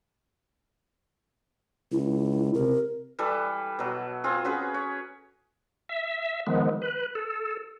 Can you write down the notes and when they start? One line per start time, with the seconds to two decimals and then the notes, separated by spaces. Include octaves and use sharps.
1.92 C#2 E4
2.54 C3 A#4
3.19 E3 G3 A4 B4
3.79 B2 F#3
4.24 C4 F4 G#4
4.45 C#4 F#4 G#4 B4
4.74 C#5
5.89 E5
6.47 D#3 F3 G#3 B3
6.82 B4
7.15 A4